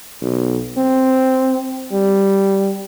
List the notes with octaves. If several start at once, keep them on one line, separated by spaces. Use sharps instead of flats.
B1
C4
G3